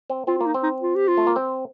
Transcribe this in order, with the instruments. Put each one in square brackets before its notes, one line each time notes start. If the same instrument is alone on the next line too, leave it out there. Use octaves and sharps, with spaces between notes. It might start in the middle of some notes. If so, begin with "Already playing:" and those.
[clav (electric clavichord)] C4
[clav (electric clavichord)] C4 [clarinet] F4
[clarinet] F4
[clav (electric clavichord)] A#3
[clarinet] D#4
[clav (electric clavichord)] C4
[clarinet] D#4
F4
G4
F4
[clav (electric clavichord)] A3
A#3
C4